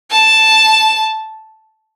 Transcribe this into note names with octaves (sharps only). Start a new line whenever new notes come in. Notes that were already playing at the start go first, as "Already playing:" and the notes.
A5